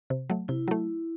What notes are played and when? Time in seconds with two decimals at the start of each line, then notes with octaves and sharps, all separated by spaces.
0.10 C3
0.30 F#3 A3
0.48 C3 E4
0.68 F#3 A3